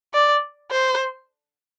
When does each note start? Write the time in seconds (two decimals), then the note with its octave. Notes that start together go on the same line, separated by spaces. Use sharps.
0.14 D5
0.71 C5